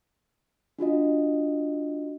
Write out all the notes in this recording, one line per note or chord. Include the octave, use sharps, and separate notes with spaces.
D4 F4 F#4 D#5